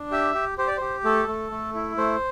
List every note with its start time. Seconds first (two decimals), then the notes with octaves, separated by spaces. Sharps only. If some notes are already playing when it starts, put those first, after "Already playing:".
Already playing: D4
0.11 G4 E5
0.35 G4
0.58 G4 C5
0.67 D5
0.77 G4 C5
1.04 A3 A4
1.28 A3
1.51 A3
1.74 E4
1.97 A3 C5